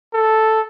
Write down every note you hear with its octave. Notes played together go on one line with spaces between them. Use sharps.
A4